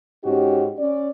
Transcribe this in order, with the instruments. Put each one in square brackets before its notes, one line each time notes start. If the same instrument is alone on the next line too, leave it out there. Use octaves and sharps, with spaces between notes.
[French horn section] G#2 C#4 D#4 F#4 G4
C#4 D5